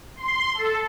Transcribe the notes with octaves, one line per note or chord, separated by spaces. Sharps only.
C6
A4